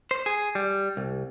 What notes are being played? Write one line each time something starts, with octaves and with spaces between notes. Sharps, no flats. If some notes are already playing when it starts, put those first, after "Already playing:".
C5
G#4
G3
C2